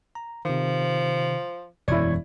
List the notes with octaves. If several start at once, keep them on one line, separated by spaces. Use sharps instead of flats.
A#5
C3 D#3 F3
E1 F#2 E4 C#5 D5 C#6 G#6